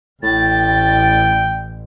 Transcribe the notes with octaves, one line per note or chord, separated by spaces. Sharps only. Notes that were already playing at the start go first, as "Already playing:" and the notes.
A1 A2 G5 A6